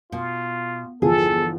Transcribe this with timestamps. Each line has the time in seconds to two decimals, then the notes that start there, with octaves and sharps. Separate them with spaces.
0.12 B2 F4
1.02 G1 E2 F3 G#4 A4